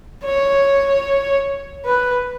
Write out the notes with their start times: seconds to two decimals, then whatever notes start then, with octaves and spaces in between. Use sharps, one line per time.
0.24 C#5
1.85 B4